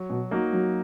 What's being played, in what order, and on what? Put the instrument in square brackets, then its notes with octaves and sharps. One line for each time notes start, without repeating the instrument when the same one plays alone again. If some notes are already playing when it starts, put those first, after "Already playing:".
Already playing: [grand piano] F#3
[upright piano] B2
[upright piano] F#3 [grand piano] A#3 D#4 F#4
[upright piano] F#3